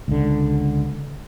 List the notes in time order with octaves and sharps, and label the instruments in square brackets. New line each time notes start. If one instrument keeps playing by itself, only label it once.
[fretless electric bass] C#2 D3